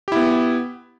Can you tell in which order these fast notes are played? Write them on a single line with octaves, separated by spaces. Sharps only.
G4 E4 B3